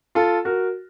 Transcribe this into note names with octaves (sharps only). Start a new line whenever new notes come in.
F4 A4
F#4 A#4